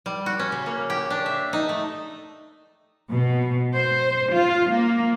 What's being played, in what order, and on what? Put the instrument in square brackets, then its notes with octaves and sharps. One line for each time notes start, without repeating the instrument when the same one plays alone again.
[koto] G3
F#4
C#4
C#3
A#3
G4
D4
E5
D#4
A3
[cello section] B2
C5
F4
A#3